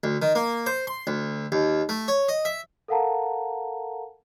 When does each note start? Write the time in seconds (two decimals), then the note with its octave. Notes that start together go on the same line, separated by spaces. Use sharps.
0.04 D2
0.22 D#3
0.35 A#3
0.66 C5
0.87 C6
1.07 D2
1.52 D#2
1.89 A3
2.08 C#5
2.29 D#5
2.45 E5
2.88 A4 A#4 F5 F#5 A5 A#5